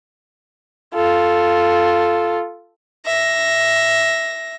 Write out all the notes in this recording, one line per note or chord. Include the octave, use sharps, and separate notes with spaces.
F4 A4
E5 A#6